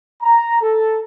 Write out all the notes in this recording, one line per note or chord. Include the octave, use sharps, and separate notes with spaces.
A#5
A4